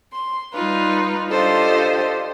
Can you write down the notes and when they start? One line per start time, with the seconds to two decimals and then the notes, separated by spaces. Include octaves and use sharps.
0.13 C6
0.53 G3 D#4 F4 B4
1.28 D4 F4 G4 A4 C5 D#5